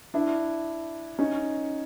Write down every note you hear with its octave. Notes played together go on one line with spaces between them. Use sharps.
D4 E4
C#4 D#4